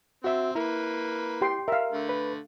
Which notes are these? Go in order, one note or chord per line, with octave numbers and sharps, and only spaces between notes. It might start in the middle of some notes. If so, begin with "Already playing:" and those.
C4 F#4 E5
A#3 E4 B4
G4 G5 C6
A#4 E5 F5
D3 A3
B4